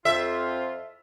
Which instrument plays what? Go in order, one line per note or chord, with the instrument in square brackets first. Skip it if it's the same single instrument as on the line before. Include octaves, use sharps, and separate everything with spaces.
[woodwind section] F2 F4 [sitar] E5